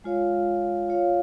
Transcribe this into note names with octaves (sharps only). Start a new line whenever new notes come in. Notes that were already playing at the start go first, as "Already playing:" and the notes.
G#3 F4 C#5 F5
F4 C#5 F5